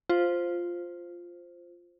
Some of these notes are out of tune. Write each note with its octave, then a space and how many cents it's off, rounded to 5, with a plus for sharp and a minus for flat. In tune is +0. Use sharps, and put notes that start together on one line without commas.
F4 +0 C5 +0